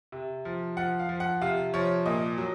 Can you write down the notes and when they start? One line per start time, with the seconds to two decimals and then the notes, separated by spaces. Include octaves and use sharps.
0.12 C3
0.45 F3
0.77 F3 F#5
0.99 F5
1.09 F3
1.20 F#5
1.41 C3 F5
1.74 F3 C#5
2.06 A#2 D#5
2.38 F#3